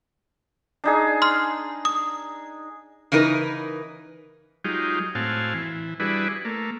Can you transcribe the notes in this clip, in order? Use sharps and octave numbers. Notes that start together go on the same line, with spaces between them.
D4 D#4 G#4
C6 F6
D#6
C#3 E3 D#4 A#4 B4
F#3 G#3 D#4 F4 G4
A2 C4 F#4 F5 G#5 A5
E3
G3 D4 E4 F#4 G#4 B4
A3 A#3